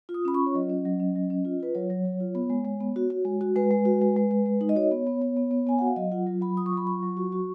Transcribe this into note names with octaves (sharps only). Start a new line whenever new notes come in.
F4
D#6
C#4 B5
C#6
F4
C#5
F#3 D#5
C#4
F#3
C#4
F#3
C#4
F4
F4 B4
F#3 C#5
F#3
F#3
F4
B3
G#3
G#3
B3
F#4
F#4
G#3
F#4
G#3 B4
G#3
F#4
G#3
G#3
G#3
G#3
D#4
D#5
F#4 C#5
B3
B3
B3
B3
B3
B3 G#5
F#4 F#5
F5
F#3 D#5
F4 F#5
F#3
F#3 B5
F4 D#6
C#6
F#3
B5
F4 C#6
F#3
F#4
F#4